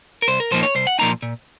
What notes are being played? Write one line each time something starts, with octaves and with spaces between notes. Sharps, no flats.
A#4
C2 C5
A#4
A#2 F3 A#3 D#4 C5
C#5
C2 C5
F#5
A#2 F3 A#3 D#4 A#5
A#2